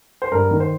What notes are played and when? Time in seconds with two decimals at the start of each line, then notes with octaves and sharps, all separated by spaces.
0.22 C5
0.32 G2 A#4
0.51 D#3
0.60 C5